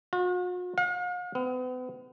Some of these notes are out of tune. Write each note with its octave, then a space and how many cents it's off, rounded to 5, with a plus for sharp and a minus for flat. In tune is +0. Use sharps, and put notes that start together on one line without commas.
F#4 -45
F5 +45
B3 +40